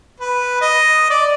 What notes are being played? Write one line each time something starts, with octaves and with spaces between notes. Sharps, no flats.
B4
D#5
D5